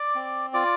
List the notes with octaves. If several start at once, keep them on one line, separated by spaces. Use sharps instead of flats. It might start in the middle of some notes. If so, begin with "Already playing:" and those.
Already playing: D5 D6
C4
F4 D5 D6